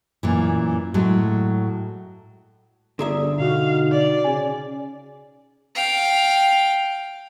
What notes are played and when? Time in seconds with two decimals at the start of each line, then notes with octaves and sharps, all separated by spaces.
0.23 F#2 A#2 E3
0.94 A2 F#3 G#3
2.99 G1 D3 G#4 D5 E5 A#5 D#6
3.39 B2 D#4 F#4 F5
3.92 D5
4.24 C#3 G#5
5.75 F5 G5